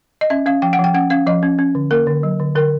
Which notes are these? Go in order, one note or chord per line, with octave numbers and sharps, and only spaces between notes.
D#5
C#4 E5
C#4 F5
F3 G5
F#5
F3
G5
C#4 F#5
C#4 F5
F3 D#5
C#4
C#4
D3
A#3 A#4
D3
F#3
D3
D3 A#4